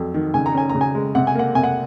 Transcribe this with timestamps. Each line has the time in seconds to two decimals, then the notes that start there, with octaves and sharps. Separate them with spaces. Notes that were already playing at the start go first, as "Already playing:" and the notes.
Already playing: F2 F#3
0.14 D#3
0.34 C#3 G#5
0.46 A#5
0.55 C#4 G#5
0.70 A#5
0.75 C#3
0.81 G#5
0.95 G#3
1.15 C3 F#5
1.27 G#5
1.35 A#3 F#5
1.55 C3 G#5
1.64 F#5